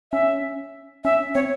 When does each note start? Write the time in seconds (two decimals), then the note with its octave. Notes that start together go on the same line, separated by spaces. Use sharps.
0.12 C#4 E5
1.04 C#4 E5
1.35 C4 C#5